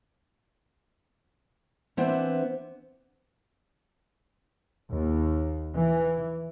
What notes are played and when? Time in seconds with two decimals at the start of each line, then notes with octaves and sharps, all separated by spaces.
1.97 E3 B3 C4 D4 E4 C5
4.91 D#2
5.76 E3